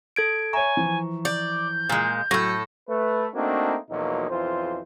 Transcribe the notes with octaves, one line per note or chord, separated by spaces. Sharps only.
A4 G#6 D7
C#5 E5 G#5 A#5 C#6
E3 F3
D5 G6
A#2 G#3
A2 F#3 A4 A#6
A3 B4
A3 A#3 C4 D4 D#4 F#4
B1 E2 B2 F3 A#3 D#4
B1 F2 E3 F4 C5